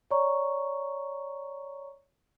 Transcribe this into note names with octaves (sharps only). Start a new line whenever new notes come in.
C#5 D5 A#5 C#6